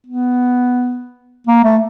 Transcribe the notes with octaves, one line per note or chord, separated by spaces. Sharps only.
B3
A#3
A3